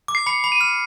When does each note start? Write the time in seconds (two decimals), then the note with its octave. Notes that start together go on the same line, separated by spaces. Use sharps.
0.08 D6
0.15 C7
0.26 B5 C#7
0.44 B5
0.52 D#7
0.61 F6